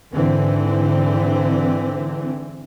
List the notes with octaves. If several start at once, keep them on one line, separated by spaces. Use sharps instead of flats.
G#2 D3 E3 C4